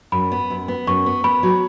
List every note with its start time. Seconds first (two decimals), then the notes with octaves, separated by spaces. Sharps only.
0.12 F#2 B5
0.32 B3
0.50 F#2
0.68 B3
0.87 F#2 C#6
1.06 B3
1.24 B3 B5
1.43 F#3